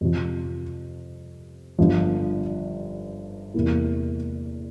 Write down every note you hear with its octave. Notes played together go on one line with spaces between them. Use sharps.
F2 C3 F3
G1 G2 F3
E2 C3 E3 A#3 E4